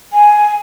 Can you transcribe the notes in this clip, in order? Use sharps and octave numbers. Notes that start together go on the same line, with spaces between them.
G#5